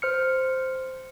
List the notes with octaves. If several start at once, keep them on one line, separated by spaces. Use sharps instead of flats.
C5 F6 C#7